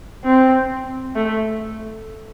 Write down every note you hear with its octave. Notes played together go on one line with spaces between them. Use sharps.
C4
A3